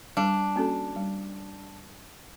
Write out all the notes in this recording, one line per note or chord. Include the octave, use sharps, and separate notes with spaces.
G3 D4
A#3 C#4 F#4 A4
G3